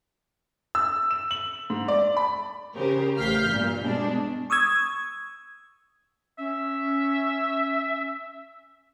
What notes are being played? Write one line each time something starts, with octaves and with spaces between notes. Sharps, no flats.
E6
E7
F#7
G#2
D5
B5
C#3 G4 A#4 C5
A1 F5 F6 G6 B6
G2 A#2
B2 G#3 D4
C#6 D#6 E6 G#6
C#4 E5